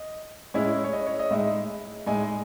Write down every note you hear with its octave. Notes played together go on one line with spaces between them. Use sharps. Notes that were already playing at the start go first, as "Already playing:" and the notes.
Already playing: D#5
A2 G#3 C#4 E4 C#5
C#5
D#5
C#5
D#5
A2 G#3 D#4 E5
A2 G#3 D#4 G#5